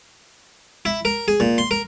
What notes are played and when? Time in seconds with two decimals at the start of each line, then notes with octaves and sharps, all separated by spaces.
0.85 E4
1.05 A#4
1.28 G#4
1.40 A#2
1.58 C6
1.71 A#4